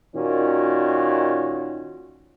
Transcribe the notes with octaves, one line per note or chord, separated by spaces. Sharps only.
A#2 D#3 C#4 F#4